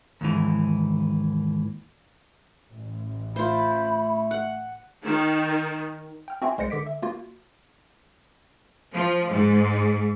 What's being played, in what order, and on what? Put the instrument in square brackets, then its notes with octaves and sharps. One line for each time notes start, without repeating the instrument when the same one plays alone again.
[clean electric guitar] D#2 G#2 E3
[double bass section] A1
[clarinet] A3 [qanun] F4 C5 [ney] B5
[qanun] F#5
[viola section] D#3
[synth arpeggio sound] G5 F6
C4 F#4 E5 G#5 C6
C2 G#3 C5 A#6 C#7
D3 D6 B6 D7
E5
A#3 F4 F#4
[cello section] F3
G#2